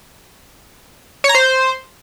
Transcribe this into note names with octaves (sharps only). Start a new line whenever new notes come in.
C#5
A#5
C5